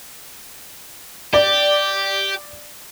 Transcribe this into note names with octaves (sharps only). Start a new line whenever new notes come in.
G4 D5